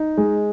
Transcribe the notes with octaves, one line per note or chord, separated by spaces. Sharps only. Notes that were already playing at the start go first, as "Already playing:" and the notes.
Already playing: D#4
G#3